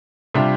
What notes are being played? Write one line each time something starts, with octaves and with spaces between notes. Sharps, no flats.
C3 G3 D4 F4